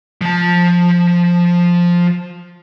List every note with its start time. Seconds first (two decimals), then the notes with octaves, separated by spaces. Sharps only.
0.21 F3 A5